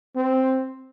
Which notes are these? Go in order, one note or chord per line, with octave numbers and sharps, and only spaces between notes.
C4